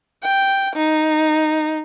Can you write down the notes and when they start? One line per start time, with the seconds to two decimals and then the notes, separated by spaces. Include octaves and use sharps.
0.23 G5
0.76 D#4